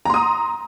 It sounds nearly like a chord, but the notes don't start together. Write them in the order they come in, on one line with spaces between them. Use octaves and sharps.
A#5 C6 D#6